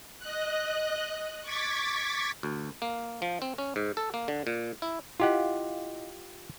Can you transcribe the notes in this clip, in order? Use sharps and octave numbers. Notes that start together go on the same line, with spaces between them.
D#5 F#6
C#6 D6 G#6 A6 B6
D2
A#3
F3
C4
C#4
G#2
A4
A#3
D3
A#2
E4
E4 F4 G4 D#5 F5 F#5